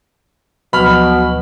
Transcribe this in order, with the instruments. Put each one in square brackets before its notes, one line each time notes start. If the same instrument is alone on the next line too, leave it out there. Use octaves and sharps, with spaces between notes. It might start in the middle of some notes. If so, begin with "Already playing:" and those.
[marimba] D2 F3 F#3 [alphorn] B2 [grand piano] B5 F6